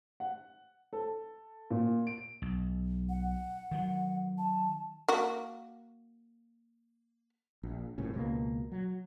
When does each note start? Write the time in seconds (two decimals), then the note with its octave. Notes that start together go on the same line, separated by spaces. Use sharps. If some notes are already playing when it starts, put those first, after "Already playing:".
0.20 F#5
0.93 A4
1.71 A#2
2.07 D7
2.42 B1
3.09 F#5
3.71 D#3 F#3
4.38 A5
5.08 A#3 F#4
7.63 A#1
7.98 G1 C2 A2 C#4
8.14 C#2 B2 G#3 A#3
8.72 F#3